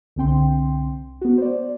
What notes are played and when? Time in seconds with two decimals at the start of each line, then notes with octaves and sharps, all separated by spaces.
0.16 C2 D3 C4 G5 C6
1.21 B3 F#4
1.38 C5 D5